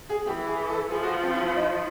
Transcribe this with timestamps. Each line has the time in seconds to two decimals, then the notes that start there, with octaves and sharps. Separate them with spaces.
0.09 G#4
0.26 E3 G4
0.48 G#4
0.69 A4
0.91 F3 G#4
1.03 F#4
1.07 F4
1.24 C4
1.34 E4
1.40 F4
1.56 D#4